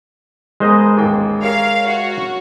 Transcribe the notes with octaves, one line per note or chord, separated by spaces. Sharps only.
E1 G#3 B3 C5 D#5 A#5
A1 D#2 G5
A#4 C#5 F5
F#4 C#5